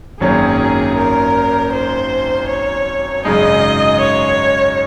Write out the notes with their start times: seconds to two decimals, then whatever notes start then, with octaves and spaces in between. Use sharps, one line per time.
0.20 G#1 F#2 D#3 A#3 C#4 G#4
0.96 A#4
1.73 C5
2.49 C#5
3.25 G#1 F#2 C#3 G#3 D#4 D#5
4.00 C#5